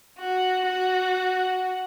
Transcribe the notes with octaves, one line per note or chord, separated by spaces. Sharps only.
F#4
F#4